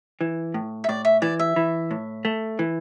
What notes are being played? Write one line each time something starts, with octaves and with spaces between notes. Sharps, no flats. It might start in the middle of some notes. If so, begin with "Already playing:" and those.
E3
A2
E5
A2 D5
E5
E3 D5
E5
E3
A2
A3
E3